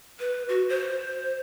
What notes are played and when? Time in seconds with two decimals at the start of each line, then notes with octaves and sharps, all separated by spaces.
0.19 B4
0.49 F#4
0.69 C5